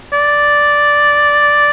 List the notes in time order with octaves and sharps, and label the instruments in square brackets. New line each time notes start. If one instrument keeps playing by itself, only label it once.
[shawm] D5